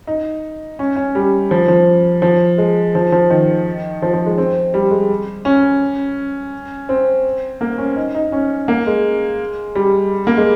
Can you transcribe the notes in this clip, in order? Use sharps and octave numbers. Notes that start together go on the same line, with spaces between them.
D#4
C#4
C#4
G3
F3
F3
F3
G#3
F3
F3
D#3
F3
F3
G#3
C4
G3
G#3
C#4
C4
A#3
C#4
D#4
D#4
C#4
A#3
G#3
G3
A#3
G#3